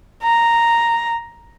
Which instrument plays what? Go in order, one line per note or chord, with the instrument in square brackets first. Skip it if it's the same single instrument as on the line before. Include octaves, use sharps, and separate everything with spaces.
[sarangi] A#5